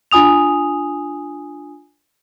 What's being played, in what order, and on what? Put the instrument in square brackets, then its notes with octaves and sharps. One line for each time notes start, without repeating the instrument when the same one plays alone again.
[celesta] D4 F4 G#5 D#6 F7